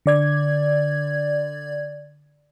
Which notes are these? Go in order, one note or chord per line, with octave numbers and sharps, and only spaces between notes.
D3 D5 G#6